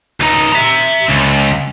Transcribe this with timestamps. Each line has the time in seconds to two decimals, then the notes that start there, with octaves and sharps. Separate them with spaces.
0.20 C#2 D#4
0.53 E5 A#5
1.09 C#2